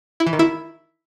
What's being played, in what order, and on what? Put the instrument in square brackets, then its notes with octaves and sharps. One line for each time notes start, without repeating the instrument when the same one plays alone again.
[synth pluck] E4
E3
D#3
E4